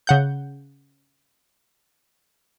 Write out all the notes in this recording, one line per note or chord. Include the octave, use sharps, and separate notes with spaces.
C#3 F#5 G6